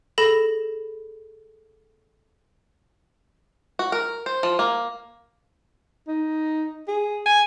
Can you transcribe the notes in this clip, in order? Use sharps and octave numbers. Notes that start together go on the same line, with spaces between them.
G#4 A4 B5 A#6 E7
F#4
A#4
C5
F3
A#3
D#4
G#4
G#5